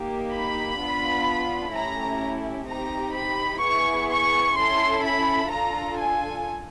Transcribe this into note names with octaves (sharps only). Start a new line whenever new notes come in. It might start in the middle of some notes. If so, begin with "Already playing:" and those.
Already playing: A#3 D#4 G4
B5
B3 D4 F4
A3 C#4 E4 G4 A#5
C4 D#4 G4 A#5
B5
B3 E4 G#4 C#6
C#6
C#4 E4 A4 C6
B5
D4 F4 A4 A#5
G#5